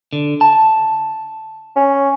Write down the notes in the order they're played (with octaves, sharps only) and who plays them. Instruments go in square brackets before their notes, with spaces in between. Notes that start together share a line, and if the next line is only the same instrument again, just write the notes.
[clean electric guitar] D3
A5
[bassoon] C#4